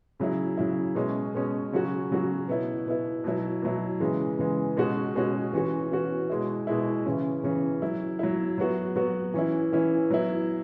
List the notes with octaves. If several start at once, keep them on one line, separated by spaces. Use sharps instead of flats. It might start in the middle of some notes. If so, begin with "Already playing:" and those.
C#3 F#3 E4
C#3 F#3 E4
B2 G#3 C#4
B2 G#3 C#4
C#3 F#3 C#4 F#4
C#3 F#3 C#4 F#4
B2 B3 E4
B2 B3 E4
B2 F#3 E4
B2 F#3 E4
C#3 E3 G#3
C#3 E3 G#3
B2 G#3 C#4 F#4
B2 G#3 C#4 F#4
E3 C#4 F#4
E3 C#4 F#4
B2 G#3 E4
B2 G#3 E4
C#3 E3 C#4
C#3 E3 C#4
F#3 E4
F#3 E4
F#3 B3 F#4
F#3 B3 F#4
E3 C#4 E4
E3 C#4 E4
F#3 B3 E4